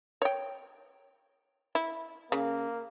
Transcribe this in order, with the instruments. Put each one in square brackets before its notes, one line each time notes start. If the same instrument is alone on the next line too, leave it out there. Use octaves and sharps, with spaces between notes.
[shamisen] C#5 G5
E4
[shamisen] C#3 [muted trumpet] A#3